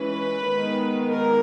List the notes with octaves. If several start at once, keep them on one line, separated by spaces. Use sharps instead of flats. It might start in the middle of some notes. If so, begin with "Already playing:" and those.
Already playing: E3 G#3 C#4 B4
D#3 G#3 B3
A#4